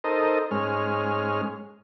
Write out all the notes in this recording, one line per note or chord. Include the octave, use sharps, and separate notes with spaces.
D#4 A4 A#4 C5 D#5
G#2 G#3 C#4 F6